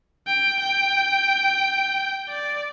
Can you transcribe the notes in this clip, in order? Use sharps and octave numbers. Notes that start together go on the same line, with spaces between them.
G5
G5
D5